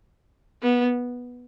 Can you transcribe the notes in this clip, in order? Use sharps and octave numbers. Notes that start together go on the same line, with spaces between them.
B3